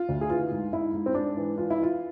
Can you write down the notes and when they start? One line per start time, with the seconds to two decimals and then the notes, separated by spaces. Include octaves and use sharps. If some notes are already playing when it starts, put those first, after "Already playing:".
Already playing: F4
0.09 D2
0.21 G#4
0.30 E3 F4
0.51 G#2
0.72 G#2 E4
0.94 G#2
1.06 C4
1.14 G#2 D4
1.37 E3
1.57 E3 F4
1.70 E4
1.78 E3 F4